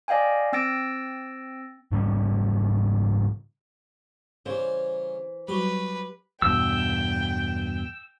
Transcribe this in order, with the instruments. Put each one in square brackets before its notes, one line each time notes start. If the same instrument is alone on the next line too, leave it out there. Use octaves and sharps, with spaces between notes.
[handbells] D5 D#5 F5 G5 G#5
C4 G5 E6 A6 A#6 D7
[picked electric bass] G#2 C#3 G3 C#4
[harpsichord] C#3 G3 [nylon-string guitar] E3 C5
[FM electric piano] F#3 G3 [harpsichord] G4 [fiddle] B4
[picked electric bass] E2 G2 B2 [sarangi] G5 [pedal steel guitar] E6